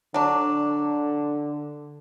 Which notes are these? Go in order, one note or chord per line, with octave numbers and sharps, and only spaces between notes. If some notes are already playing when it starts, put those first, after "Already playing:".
D3 F#3 D4